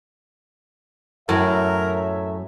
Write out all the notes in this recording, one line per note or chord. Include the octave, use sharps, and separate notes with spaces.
F#2 A2 F#3 A#4 E5